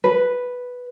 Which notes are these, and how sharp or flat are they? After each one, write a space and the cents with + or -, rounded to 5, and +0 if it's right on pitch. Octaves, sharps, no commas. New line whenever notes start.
B4 +0